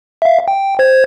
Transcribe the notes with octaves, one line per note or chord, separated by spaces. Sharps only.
E5 F5
G5
C5 G#6